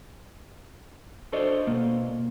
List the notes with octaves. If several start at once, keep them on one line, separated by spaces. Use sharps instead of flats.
D4 F#4 A4 C5 D5 D#5
B2 A#3